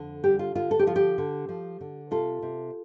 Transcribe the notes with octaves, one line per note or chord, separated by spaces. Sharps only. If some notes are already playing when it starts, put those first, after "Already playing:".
Already playing: F2 D3
G3 G4
F4
D3 F4
A4
G4
F3 F4
G4
D3
F3
D3
C3 F4 A4
C3